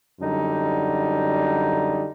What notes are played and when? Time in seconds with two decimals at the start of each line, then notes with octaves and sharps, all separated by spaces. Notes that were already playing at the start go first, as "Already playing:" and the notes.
0.21 F#2 D3 G3 D#4